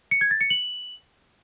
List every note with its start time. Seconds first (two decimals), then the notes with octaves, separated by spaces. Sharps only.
0.11 C#7
0.21 G#6
0.31 A6
0.41 C#7
0.50 F#7